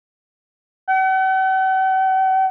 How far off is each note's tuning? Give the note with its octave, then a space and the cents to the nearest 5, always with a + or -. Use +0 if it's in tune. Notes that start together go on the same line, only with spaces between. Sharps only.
F#5 +45